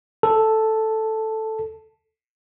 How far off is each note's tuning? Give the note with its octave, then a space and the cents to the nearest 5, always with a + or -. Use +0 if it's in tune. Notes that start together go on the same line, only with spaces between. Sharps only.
A4 +0 A5 +0